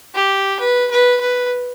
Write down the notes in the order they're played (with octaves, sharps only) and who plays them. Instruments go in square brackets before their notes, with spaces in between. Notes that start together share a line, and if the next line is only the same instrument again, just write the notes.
[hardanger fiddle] G4
B4
B4
B4